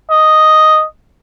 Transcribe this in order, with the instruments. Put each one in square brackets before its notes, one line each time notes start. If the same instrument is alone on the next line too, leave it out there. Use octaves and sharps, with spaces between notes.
[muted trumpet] D#5